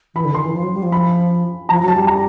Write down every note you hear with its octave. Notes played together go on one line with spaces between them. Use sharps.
E3 B5
D3
D#3 C6
E3
F3
F#3
G3
F3
B5
F3 A#5
F#3
A5
G3
A#5